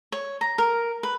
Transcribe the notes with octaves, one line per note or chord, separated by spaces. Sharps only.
C#5
A#5
A#4
B4